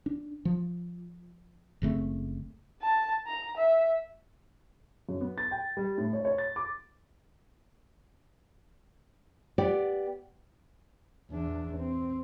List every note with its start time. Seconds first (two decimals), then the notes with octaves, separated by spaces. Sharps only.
0.06 D4
0.45 F3
1.82 F#1 C#3 A3 C4
2.82 A5
3.27 A#5
3.57 E5
5.09 F#2
5.21 B3
5.38 A6
5.51 G5
5.77 G3
5.98 A2
6.13 C#5
6.25 C#5
6.38 A6
6.56 D6
9.58 B3 G4 D5
11.31 E2 D4
11.77 C4